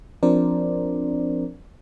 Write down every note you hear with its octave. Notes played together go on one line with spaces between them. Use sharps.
F3 C4 D4 A#4 C5 D5